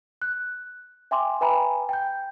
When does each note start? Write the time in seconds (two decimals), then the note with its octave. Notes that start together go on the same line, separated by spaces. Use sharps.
0.22 F#6
1.11 E5 G5 G#5 C6 D6
1.41 B4 E5 G5 G#5 A#5 B5
1.89 G5 G6